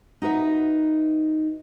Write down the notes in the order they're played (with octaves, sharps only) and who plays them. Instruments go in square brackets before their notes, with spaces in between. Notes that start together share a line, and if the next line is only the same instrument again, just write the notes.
[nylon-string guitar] D#4 F#4 B4 E5